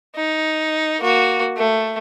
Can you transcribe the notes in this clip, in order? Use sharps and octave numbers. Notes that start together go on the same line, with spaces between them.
D#4
A#3 F#4
A3